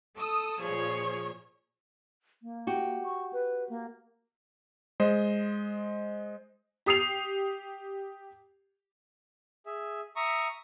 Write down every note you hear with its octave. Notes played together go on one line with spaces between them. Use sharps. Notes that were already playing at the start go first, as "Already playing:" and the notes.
A4 D#6 E6
A#2 F3 G#4 C#5
A#3
F#4 G4
C#6
B4
A#3
G#3 C5 D#5
G4 D#6 C7 F7
G#4 E5
E5 A#5 C#6 D#6